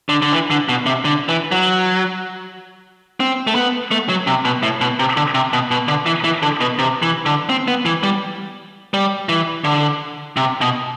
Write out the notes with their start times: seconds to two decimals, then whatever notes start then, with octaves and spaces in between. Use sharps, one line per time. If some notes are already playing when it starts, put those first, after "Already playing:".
0.09 D3
0.22 D3
0.32 E3
0.51 D3
0.69 B2
0.86 C3
1.05 D3
1.29 E3
1.52 F#3
3.20 C4
3.47 A3
3.55 B3
3.91 A3
4.09 F#3
4.27 C3
4.45 B2
4.63 A2
4.81 B2
4.99 C3
5.17 D3
5.34 C3
5.53 B2
5.71 B2
5.88 D3
6.06 E3
6.24 E3
6.42 D3
6.60 B2
6.79 C3
7.02 E3
7.26 D3
7.49 C4
7.68 B3
7.85 E3
8.03 G3
8.94 G3
9.29 E3
9.64 D3
10.37 C3
10.61 B2